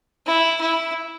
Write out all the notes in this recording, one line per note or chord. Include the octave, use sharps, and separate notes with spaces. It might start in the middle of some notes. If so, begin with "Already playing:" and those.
E4
E4